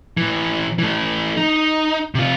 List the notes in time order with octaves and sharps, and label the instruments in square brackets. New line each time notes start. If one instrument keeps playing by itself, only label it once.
[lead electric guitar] A2 E3
E3 A3
D#4
C3 F4